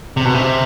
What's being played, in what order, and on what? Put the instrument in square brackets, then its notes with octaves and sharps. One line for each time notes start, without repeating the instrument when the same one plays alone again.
[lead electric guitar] C3
B2
C3